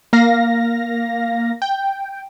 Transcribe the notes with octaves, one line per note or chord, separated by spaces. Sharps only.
A#3 F5 A#6
G5